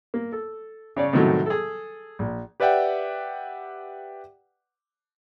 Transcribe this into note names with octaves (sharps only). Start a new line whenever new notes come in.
A#3
A4
C#3 C#5 D5
A2 C3 D#3 F#3 G3 A3
G#4 A4
A#1
G4 B4 D5 E5 F#5 G5